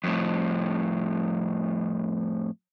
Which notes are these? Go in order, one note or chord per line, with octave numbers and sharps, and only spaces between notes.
F2 A2